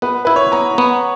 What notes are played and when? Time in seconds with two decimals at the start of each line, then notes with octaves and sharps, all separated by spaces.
0.02 B3 B4
0.25 E4 B4
0.36 C#5
0.52 B3 A#5
0.78 B3